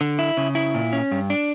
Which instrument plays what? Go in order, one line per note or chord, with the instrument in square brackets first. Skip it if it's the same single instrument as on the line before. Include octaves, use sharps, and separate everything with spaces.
[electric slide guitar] D3
E4
C#3
E4
A#2
C#4
G2
D4